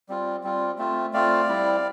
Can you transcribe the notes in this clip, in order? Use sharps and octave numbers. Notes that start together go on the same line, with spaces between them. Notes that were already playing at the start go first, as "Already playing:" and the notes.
G3 C4 F4
G3 C4 F4
A3 C4 F4
A3 C4 F4 D5 F5
G3 C4 E4